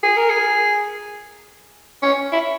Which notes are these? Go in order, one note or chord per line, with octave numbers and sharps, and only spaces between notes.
G#4
A#4
G#4
C#4
E4